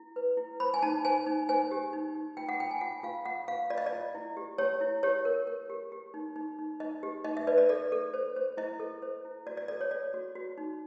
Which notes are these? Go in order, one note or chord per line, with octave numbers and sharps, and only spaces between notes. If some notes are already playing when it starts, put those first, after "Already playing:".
Already playing: E4
B4
E4
C5 B5
G#5
D#4 A5
C5 G#5
D#4
C5 G#5
G4
D#4
D#4
F4 G5
F#5
F4 G5
G#5
F4 F#5
F4 F5
F4 F#5
F4 F5
F4 D5
D#5
D5
F4
E4
G4
G4 C#5
E4
G4 C#5
A#4
A#4
G4
G4
D#4
D#4
D#4
D#4 D#5
G4
D#4 D#5
E5
B4 D5
D5
A4 D5
A4
C5
C5
E4 D#5
A4
C5
E4
F#4 D5
D5
A4 D5
C#5
A4 D5
F#4
F#4
D#4